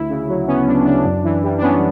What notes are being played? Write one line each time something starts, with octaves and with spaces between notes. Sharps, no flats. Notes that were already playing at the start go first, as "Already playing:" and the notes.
Already playing: D2 E4
C#3
F#3
B3 C#4
D2 D4
C#3 D4
F#2
E3
G3
D4
B3 C#4